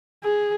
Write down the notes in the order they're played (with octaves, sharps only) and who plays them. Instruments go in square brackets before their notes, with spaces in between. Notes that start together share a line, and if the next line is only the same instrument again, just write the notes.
[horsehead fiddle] G#4